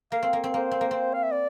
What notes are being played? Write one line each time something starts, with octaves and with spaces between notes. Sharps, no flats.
A#3 F5
C4
A#3
C4
A#3 C5
C4
A#3
C4
F5
E5
D5